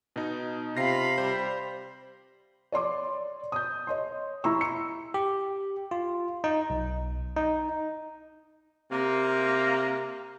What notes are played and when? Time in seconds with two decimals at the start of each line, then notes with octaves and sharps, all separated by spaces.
0.16 B2 D#4
0.77 C3 F4 F5 B5 A#6 C7
1.18 G3 C5
2.72 C#5 D5 C6 D6
3.52 D#6 G6
3.87 C#5 D#5 C6
4.44 E4 A#5 C6 C#6 E6
4.61 C#7
5.14 G4
5.91 F4
6.44 D#4
6.70 B1
7.36 D#4
8.92 C3 A#3